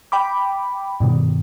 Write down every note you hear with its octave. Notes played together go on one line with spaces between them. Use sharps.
G5 B5 D6
G2 B2 D#3